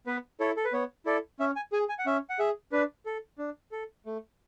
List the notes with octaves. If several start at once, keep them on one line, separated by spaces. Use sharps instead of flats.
B3 B4
E4 A4 C#5
A4
B4
B3 C#5
E4 A4 D5
C#4 E5
G#5
G#4 G#5
G#5
F#5
C#4 E5
F#5
G#4 E5
D4 B4
A4
D4
A4
A3